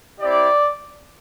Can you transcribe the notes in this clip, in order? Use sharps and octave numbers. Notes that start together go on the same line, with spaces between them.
C4 E4 G4 D5